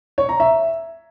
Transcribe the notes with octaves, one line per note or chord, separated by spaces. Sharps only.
C#5
A#5
E5